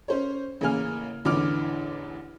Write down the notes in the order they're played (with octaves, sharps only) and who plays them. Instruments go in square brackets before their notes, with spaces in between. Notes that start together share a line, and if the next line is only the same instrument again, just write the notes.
[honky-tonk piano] C#4 C5 C#5
A1 C#3 A#3 G#5 F6
A1 E2 D3 E3 D6 F6